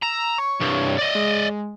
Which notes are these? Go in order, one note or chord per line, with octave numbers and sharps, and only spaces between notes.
A#5 E6
C#5
C2 G2
D5 D#5
G#3